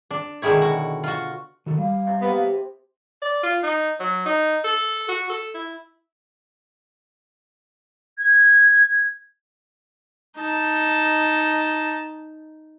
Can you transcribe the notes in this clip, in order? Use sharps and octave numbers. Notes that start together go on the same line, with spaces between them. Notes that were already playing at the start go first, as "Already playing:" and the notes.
D4
B2 D3 D#3 G#3 E4 C#5
F#4
F4 F#4
D#3 F#4 A4
G3 F5
C3
A#3 B3
D5
F4
D#4
F#3
D#4
A4
F#4
A4
E4
G#6
D#4 A5